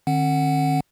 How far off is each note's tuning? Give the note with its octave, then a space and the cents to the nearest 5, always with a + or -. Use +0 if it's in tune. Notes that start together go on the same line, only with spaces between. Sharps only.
D#3 -40 C#4 -45 F#5 +0